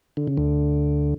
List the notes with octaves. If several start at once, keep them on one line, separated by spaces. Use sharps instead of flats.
D3
C#3
D2 D3